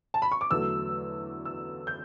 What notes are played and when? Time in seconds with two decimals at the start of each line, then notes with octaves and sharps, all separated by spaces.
0.14 A5
0.22 B5
0.32 C#6
0.41 D6
0.50 E2 D3 F#3 A3 E6
1.45 E6
1.87 G6